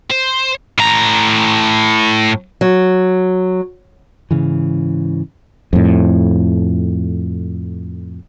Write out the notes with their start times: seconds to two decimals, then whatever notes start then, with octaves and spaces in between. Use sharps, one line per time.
0.10 C5
0.78 A2 A#5
2.61 F#3
4.31 G#2 C#3 E3
5.73 F2 A2